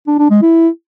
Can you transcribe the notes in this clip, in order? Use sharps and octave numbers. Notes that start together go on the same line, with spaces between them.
D4
D4
G#3
E4